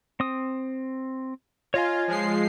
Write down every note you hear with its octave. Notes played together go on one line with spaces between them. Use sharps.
C4 D#6
F4 C#5 D#5 G#5
F3 G#3 C7